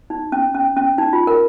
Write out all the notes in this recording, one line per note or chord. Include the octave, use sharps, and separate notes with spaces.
D#4
C#4
C#4
C#4
D#4
F4
A#4